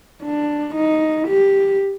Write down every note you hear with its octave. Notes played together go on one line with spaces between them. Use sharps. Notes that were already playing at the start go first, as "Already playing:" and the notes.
D4
D#4
G4